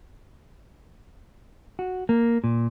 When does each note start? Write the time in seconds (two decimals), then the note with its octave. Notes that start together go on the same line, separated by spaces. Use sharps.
1.79 F#4
2.09 A#3
2.44 A#2